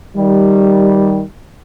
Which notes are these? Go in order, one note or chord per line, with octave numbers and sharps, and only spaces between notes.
D#3 G3